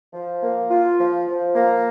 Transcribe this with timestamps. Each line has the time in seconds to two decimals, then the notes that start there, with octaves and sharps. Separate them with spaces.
0.14 F3
0.42 A#3
0.70 F4
0.99 F3
1.28 F3
1.55 A#3